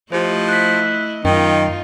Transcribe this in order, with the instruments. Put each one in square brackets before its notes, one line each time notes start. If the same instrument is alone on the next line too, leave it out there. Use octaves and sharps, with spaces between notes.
[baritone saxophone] F3 [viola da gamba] A3 E4 D#5 [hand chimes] G4 C5
[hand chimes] F#6 B6
[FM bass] F#2 [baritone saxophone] D#3 [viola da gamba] D#4 F4 [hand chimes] A#4 D#5 G5